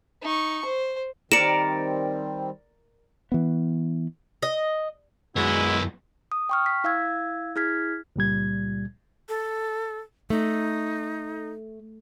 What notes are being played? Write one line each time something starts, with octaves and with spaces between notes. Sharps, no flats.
D#4 C#6
C5
D#3 G3 C4 A#4 D5 C#7 E7
E3 B3
D#5
F#2 G#3 B3 E4 F#4
D#6
G5 C#6 F6
B6
E4 F5 E6 G#6
E4 G#4 F6 G#6 B6
C#2 A#2 G3 G#6
A4
A3 D#4